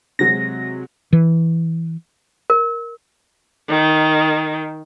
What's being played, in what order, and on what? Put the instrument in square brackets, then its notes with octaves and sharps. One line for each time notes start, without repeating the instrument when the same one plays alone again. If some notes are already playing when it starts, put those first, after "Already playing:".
[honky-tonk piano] C3 F#3 G#3 [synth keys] A#6
[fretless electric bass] E3
[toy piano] A#4
[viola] D#3